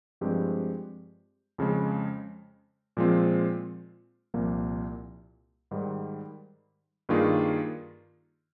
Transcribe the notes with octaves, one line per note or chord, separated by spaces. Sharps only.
G2 F3 G#3 C4 G4
F2 C#3 G#3
A#2 F3 G#3 C4 F4
C2 A#2 F3 A#3
G#2 D#3 G3
G2 D#3 A#3 F4 G#4